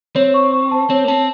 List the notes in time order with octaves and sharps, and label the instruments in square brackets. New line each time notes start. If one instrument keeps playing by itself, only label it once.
[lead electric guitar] C4 [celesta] C#5
[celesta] C#6
C#6
A5
[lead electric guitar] C4 [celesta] C#5
[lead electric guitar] A#3
[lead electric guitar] C4 [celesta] A5